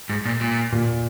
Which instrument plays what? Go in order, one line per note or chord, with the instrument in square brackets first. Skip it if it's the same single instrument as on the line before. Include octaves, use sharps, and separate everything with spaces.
[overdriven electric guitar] G#2
A#2
A#2
[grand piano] A#2